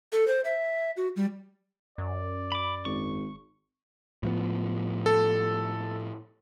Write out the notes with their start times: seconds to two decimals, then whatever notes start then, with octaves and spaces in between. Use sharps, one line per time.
0.12 A4
0.28 C5
0.45 E5
0.97 F#4
1.16 G3
1.98 F#2 D5
2.52 B5 D6
2.85 G#1 C#6
4.23 A2 F3 B3
5.06 A4